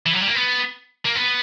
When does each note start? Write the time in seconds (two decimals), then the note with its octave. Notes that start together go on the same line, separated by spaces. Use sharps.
0.06 E3
0.13 F#3
0.21 G3
0.28 A#3
0.35 B3
1.05 A#3
1.15 B3